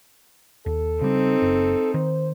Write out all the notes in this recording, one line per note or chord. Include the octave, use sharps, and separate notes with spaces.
D#2 A4
C#3 G3 C4 D#4
F#1
D#3 C5